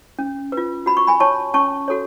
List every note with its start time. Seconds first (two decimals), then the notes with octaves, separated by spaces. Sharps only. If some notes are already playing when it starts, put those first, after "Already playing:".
0.19 C#4
0.52 B4
0.57 F4
0.86 F#4 B5
0.97 C#6
1.07 G#5 B5
1.20 C#5 A5 C#6
1.54 C#4 A5 C#6
1.88 F#4 A4 C#5